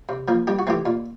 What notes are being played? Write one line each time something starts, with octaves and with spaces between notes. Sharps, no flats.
C3
F3 A#3
G2 G4
F#4
E3 A3 C4 G4
A#2